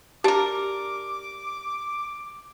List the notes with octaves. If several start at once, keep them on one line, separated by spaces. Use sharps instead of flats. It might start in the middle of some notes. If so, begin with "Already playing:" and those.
D4 G4 A#4 D6